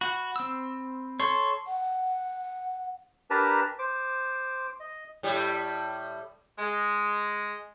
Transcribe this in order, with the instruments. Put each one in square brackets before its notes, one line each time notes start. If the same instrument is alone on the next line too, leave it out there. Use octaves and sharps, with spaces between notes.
[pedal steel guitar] F#4 F#5 [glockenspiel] B5
[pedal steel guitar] C4 E6
[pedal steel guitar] A4 C#5 [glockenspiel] C6 C#6 C7
[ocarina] F#5
[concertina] D4 G4 A#4 B4 A5 A#5
C5 D6
D#5
[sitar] A2 G3
[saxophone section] G#3